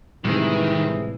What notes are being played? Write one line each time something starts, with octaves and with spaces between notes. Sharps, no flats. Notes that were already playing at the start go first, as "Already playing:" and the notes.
A2 C3 D#3 E3 G3 G#3 C4